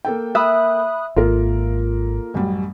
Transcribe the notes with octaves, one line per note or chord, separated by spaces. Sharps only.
A#3 A4 G5
E5 B5 D#6 F#6
G#1 A#3 F4 A4 A#4
A1 F#2 G3